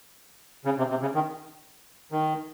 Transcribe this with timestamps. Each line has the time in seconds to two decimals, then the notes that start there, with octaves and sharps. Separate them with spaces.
0.65 C#3
0.78 C3
0.90 C3
1.01 C#3
1.14 D#3
2.12 D#3